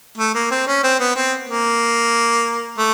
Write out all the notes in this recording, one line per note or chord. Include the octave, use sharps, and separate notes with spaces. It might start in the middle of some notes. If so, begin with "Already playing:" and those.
A3
A#3
C4
C#4
C4
B3
C4
A#3
A3